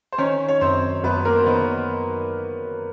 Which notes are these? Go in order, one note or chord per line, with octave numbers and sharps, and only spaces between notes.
C5
D#3 C#4 C#5
C#5
F#2 C4 C5
F#2 B3 B4
A#3 A#4
C5
D#3 B3 B4